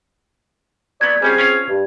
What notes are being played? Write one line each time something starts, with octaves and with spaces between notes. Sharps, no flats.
F#3 B3 D5 G#6
G3 C4 C#4 F4 G#4
C#4 F4 F5
G2